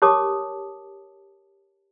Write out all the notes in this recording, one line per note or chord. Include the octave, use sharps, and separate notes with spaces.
G4 A#4 C#5 A5 D6 D#6